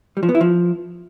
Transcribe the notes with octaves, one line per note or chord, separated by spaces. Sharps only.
G3
F3
B3
E4
F3